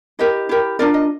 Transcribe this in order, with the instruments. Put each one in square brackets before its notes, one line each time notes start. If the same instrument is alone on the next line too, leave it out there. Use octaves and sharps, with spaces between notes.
[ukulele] E4 G4 A#4 D#5
E4 G4 A#4
D4 F4 A#4 D5
D#5